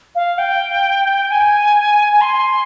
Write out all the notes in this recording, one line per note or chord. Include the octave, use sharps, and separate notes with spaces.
F5
G5
G#5
C6